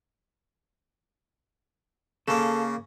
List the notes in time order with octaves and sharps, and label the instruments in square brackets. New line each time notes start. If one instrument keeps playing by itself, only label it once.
[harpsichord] C#3 A#3 [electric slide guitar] A4